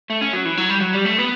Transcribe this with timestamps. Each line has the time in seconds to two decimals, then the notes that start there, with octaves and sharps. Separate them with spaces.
0.10 A3
0.21 C#4
0.33 F#3
0.45 E3
0.58 F#3
0.70 G3
0.81 F#3
0.94 G3
1.06 A3
1.19 B3